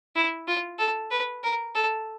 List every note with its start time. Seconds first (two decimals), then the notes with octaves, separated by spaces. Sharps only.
0.16 E4
0.48 F4
0.79 A4
1.11 B4
1.43 A#4
1.75 A4